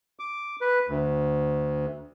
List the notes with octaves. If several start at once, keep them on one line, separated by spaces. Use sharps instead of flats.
D6
B4
D2